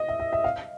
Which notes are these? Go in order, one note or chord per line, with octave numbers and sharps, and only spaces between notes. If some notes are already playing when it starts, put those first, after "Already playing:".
Already playing: D#5
E5
E5
E5
F5